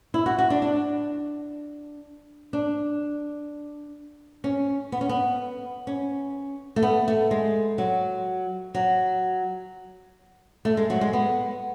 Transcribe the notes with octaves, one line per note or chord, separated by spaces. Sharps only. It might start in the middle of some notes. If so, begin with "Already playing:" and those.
E4
F#4
F#4
D4
D4
D4
C#4
B3
C#4
B3
C#4
A3
B3
A3
G#3
F#3
F#3
A3
G#3
F#3
G#3
B3